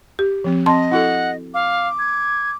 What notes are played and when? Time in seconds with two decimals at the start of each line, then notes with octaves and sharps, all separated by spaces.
0.19 G4
0.44 F3 C4
0.66 C4 D#5 A5 C6
0.91 E4 F#4 A4 F#5
1.54 F5 D6
1.99 G#6